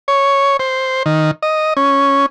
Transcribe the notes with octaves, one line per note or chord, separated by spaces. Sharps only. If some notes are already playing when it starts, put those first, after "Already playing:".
C#5
C5
D#3
D#5
C#4